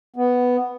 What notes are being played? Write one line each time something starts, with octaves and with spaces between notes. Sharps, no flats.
B3